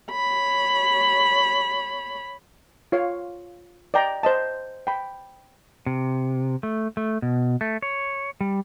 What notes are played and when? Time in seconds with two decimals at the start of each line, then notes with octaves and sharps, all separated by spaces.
0.11 C#5 B5
2.92 F4 C#5 F5
3.94 D5 D#5 G5 A#5
4.23 C5 D#5 A5
4.87 G5 B5
5.86 C3
6.63 A3
6.97 A3
7.22 B2
7.61 A3
7.82 C#5
8.41 G3